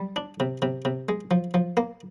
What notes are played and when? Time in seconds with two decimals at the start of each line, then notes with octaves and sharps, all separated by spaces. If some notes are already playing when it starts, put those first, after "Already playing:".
Already playing: G3
0.16 D4
0.40 C3
0.62 C3
0.85 C3
1.09 G#3
1.31 F3
1.54 F3
1.77 A#3